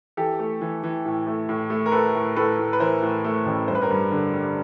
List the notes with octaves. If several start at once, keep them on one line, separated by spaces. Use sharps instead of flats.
E3 G4 A4
A3
E3
E3
A2
A3
A2
A3
A#4
A3 A4 B4
A2
A2 A4 B4
A2
B4
E3 A#4 C5
A2
A3
A1
G2 C5
B4
A#4 C5
G2
D3
G3